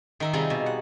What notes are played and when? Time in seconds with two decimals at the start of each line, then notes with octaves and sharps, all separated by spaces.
0.20 D#3 A#4 E5
0.33 C3 G3 D#4 F4 G#4 B5
0.50 B2
0.66 F#5